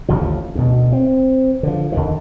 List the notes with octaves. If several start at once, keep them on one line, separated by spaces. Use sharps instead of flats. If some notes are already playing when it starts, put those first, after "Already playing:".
A1 D#2 D3 F3
D2 B2
C4
D3 F3
D#2 D3 D#3